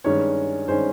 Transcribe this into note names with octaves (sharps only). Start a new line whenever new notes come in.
G2 D#3 G#3 C#4 C#5
G2 D#3 G#3 C#4 C5